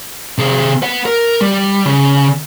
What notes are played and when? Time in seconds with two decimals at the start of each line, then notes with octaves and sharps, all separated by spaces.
0.38 C3 G#4
0.82 B4 F#5
1.06 A#4
1.41 G3
1.86 C#3